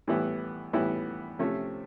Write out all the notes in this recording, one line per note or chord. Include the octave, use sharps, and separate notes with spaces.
A2 E3 G3 B3 E4
A2 E3 G3 B3 E4
C3 F3 A3 C#4